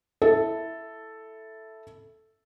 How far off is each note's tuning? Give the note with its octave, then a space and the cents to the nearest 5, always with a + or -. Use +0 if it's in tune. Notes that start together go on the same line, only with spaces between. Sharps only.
E4 +0 A4 +0